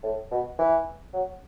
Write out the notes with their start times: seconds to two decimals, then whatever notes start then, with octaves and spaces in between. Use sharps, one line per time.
0.03 A2
0.31 B2
0.59 E3
1.13 F#3